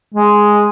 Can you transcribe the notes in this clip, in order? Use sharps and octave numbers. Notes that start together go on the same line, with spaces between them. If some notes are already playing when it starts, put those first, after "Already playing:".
G#3